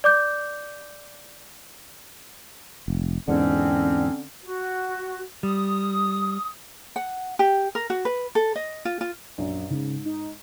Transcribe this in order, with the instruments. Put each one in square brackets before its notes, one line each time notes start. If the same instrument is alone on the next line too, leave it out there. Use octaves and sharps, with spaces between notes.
[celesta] D5 D6 G6
[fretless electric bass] F1
[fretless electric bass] E2 G#2 [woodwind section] D3 C4 C#4
[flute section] F#4
[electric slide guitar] G3 [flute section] D#6
[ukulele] F#5
G4
A#4
F#4
B4
A4
D#5
F4
F4
[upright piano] A#1 F#2
[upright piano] G#2 [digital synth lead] C#3
[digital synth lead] D#4